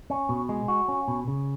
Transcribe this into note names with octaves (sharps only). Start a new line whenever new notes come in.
C#4
B2
G#3
F#4
C#4
B2
C#3